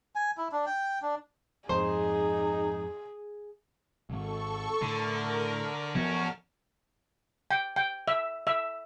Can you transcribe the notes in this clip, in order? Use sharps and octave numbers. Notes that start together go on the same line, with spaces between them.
G#5
E4
D4
G5
D4
F2 G#2 D#4 G#4 C5
D#1 G#1 A4 C#6
A2 D3 A#4
F3 B3 C#4 F#4 A5 F6
G5
G5
E5
E5